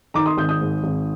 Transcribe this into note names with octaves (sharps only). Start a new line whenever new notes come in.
D#3 A#5 D6
C6 D#6
G#1 D#6 G6
D#6 G6
G#2
G#1